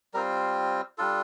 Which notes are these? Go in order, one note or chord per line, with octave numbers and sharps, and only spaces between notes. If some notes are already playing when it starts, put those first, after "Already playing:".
G3 C4 F4 A#4
G3 D4 F4 A4